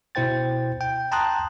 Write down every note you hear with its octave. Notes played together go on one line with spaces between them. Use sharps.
B2 E4 C5 G5 A6
G5
G5 A5 A#5 C6 D#6 F#6